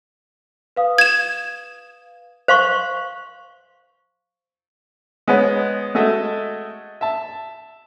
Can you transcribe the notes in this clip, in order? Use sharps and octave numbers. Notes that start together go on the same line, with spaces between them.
B4 F5 D#6
G#6 E7
C5 F5 C6 C#6
G#3 B3 C#5
G#3 A3 F#4 D#5 E5
E5 A5